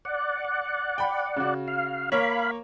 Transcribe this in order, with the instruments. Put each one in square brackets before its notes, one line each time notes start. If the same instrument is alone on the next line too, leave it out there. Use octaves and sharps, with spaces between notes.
[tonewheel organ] D5 F#5
[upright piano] G5 B5
C#3 F#4
[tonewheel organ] F5
[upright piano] A#3 C#5 [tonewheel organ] F5 B5